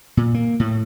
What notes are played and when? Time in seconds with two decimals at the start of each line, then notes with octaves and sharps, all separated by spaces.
0.17 A#2
0.34 A#3
0.60 A2